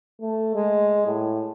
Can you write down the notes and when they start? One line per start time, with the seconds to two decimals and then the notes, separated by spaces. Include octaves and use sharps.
0.21 A3
0.55 G#3
1.06 A2